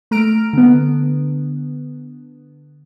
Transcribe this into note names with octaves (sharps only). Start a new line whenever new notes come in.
A3 A#5 F6 D7
D3 B3